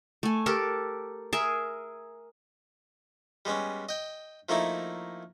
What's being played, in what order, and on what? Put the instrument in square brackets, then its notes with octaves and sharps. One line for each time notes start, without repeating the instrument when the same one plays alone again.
[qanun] A3 G#5
G4 A4 A#4
G#4 A#4 E5
[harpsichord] G3 G#3 B3 C#4
D#5 G5
F3 A3 A#3 D#4 E4